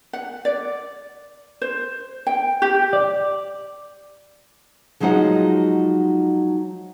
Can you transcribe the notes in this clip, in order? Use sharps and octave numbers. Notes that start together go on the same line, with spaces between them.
F#5
D5
C5
G5
G4
D5
F3 F#3 G#3 D#4 F4 F#5